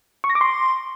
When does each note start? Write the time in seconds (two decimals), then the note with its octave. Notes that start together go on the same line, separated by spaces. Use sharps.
0.24 C#6
0.30 A#6
0.35 D6
0.41 C6